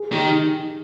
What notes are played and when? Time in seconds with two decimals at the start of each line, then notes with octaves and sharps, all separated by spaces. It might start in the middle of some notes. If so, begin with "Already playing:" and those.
Already playing: G#4
0.12 D#3 G4